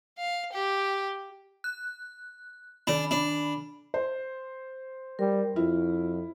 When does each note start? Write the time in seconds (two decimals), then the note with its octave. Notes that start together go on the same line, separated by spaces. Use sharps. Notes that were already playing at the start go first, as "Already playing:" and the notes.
0.19 F5
0.52 G4
1.64 F#6
2.87 D#3 D4 B5
3.11 D4
3.94 C5
5.19 G3 A#4
5.56 F2 E4 F4